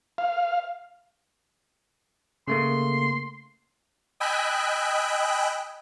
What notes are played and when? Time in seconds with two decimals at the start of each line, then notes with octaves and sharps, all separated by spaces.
0.18 F5
2.48 C#3 A3 A#3 C6
4.20 D#5 G5 G#5 B5 E6 F#6